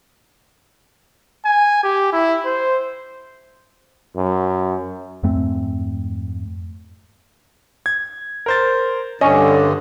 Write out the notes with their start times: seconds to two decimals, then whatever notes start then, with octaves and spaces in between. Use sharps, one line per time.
1.45 G#5
1.83 G4
2.13 E4
2.45 C5
4.17 F#2
5.23 F2 G#2 A3 C4
7.86 G#6
8.46 A#4 C5 A6
9.21 G2 D3 C#4 D#5